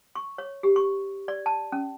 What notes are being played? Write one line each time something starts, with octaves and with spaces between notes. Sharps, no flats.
C#6
C#5
G4
C#6
D5
A5
C#4